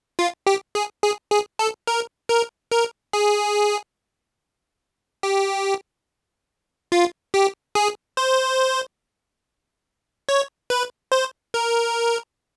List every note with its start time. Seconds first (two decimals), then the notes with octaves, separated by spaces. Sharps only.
0.19 F4
0.47 G4
0.75 G#4
1.03 G#4
1.31 G#4
1.59 A4
1.87 A#4
2.29 A#4
2.72 A#4
3.13 G#4
5.23 G4
6.92 F4
7.34 G4
7.75 G#4
8.17 C5
10.29 C#5
10.70 B4
11.12 C5
11.54 A#4